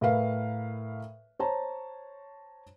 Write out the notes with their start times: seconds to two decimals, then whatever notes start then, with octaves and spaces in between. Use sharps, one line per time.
0.01 A2 A#4 B4 F5
1.39 C5 C#5 A5 A#5